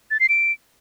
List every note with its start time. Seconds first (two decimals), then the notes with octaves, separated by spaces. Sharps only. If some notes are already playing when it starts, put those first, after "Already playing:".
0.11 A6
0.20 C7
0.29 D7